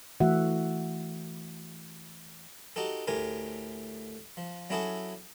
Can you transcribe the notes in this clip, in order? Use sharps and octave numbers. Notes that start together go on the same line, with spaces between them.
E3 A3 F#4 E5 F#5
D#4 F#4 G4 A4
D2 A2 G4 A#4 G#5
F3
F#3 C#4 E4 F#4 G#4 A4